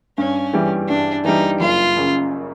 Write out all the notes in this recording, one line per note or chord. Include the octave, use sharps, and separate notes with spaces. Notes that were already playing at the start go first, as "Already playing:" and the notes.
G2 C#4
E3 G3
G2 D4
E3 G3 D#4
F#1 F4
F#2 C#3